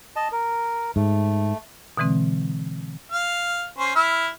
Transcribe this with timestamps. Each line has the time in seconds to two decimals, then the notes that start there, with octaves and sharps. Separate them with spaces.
0.16 D#5 A5
0.32 A#4
0.96 G#2 A3
1.97 B2 D3 E3 G#3 C4
3.12 F5
3.78 C#4 C5
3.96 E4 E5 F6